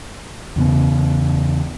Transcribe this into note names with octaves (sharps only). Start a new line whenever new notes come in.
E2 C#3 B3